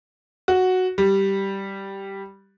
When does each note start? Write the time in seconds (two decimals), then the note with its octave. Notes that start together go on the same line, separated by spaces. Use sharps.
0.48 F#4
0.98 G3